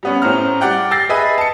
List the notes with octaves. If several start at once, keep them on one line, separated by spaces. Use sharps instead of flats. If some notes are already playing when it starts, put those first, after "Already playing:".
G3 B3 C#4
A2 C#4 C5 A#5 F6
G3 D5 F#5 G5
G5 E6 A6 A#6 C7
G#4 B4 D#5 E5 G#5
A5 C#7